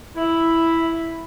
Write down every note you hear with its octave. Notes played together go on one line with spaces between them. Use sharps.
E4